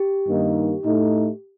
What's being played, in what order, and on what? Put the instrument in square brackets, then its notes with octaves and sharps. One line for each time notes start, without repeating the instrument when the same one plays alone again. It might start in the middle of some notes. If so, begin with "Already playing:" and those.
Already playing: [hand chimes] G4
[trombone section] G2 D#3 A#3 D#4
A2 A3 D#4